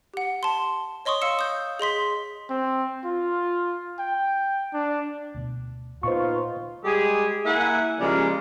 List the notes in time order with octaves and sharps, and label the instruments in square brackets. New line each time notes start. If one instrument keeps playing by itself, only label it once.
[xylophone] G4 F#5
A5 C6
C#5 D#5 C6 C#6 D#6
D#5 F5 E6 C#7 E7
D#6 G6
G#4 D#5 C6 B6
[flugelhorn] C4
F4
G5
D4
[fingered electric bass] D2 B2
[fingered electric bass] A#2 [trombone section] B3 D#4 F4 [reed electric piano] C5 C#6
[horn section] G3 G#3 G4 G#4
A#3 E4 E5 F#5 G#5
C#3 F3 G3 G#3 A#3